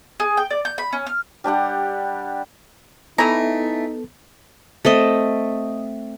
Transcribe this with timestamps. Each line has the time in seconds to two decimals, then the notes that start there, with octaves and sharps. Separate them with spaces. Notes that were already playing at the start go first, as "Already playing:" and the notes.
0.20 G#4
0.37 G5
0.50 D5
0.65 G6
0.78 B5
0.93 C#4
1.07 F6
1.44 G3 D4 G4 F#5
3.18 E3 A3 B3 D#4 E4 A4 A#5
4.85 A3 C4 D#5